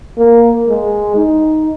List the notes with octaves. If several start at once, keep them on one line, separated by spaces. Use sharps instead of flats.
A#3
G#3
D#4